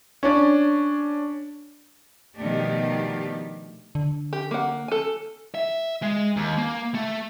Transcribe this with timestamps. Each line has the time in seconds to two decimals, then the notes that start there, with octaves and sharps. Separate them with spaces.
0.23 C#4 D4
2.39 B2 D#3 F3 A3 D4 G4
3.95 D3
4.33 G4
4.51 A#3 F#5
4.88 A4 G#5
5.55 E5
6.02 G#3
6.36 D#2
6.58 A#3
6.95 A3